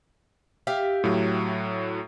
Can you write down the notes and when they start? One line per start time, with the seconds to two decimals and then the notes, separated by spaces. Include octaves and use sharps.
0.67 G4 E5 F5
1.04 A2 F#3